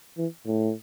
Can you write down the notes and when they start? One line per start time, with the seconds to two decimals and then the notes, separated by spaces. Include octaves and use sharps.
0.18 E3
0.46 A2